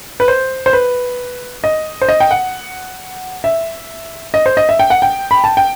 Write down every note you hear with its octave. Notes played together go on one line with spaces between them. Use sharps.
B4
C5
C5
B4
D#5
C5
D#5
G5
F#5
E5
D#5
C5
D#5
E5
G5
F#5
G5
B5
A5
G5